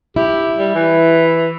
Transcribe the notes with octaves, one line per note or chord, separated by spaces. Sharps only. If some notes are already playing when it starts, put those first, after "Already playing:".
E4 G4
G3
E3